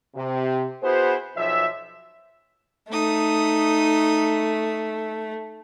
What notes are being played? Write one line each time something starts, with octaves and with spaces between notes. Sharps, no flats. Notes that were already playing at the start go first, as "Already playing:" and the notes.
C3
B3 E4 F#4 G#4 C5
B1 F3 C#5 E5
A3 D#4 D#6